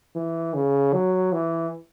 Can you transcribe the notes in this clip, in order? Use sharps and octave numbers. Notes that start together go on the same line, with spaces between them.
E3
C#3
F#3
E3